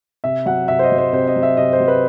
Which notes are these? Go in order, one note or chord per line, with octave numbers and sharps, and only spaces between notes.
C3 E5
F#3 F#5
C3 E5
C5
D#5
F#3
C5
C3 C5
D#5
F#3
E5
C3 D#5
C5
F#3
B4